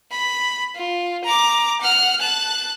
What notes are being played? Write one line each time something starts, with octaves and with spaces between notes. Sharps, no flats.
B5
F4
A#5 D6
F#5 F6
A5 F#6